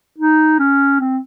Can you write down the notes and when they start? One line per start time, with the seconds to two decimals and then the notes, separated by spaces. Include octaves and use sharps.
0.18 D#4
0.59 C#4
1.00 C4